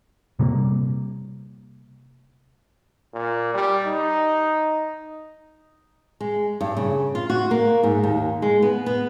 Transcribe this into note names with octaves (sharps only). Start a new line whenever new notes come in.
C3 G3 G#3 A#3
A#2
G3
D#4
G#3
G2
C#3
F4
F#4
A#3
G#2
D#2
G#3
B3
B3